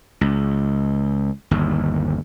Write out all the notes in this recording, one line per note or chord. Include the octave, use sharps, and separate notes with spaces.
C#2
G1 D#2